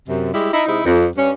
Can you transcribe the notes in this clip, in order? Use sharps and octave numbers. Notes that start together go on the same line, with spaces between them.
F#2 C3
G3 G#3 E4 G4
D#4 E4
C3 G#3 D#4 E4
F2
G2 C#4